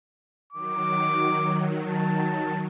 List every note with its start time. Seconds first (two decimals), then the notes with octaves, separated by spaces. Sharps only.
0.53 D#3 F#3 D6
1.85 A5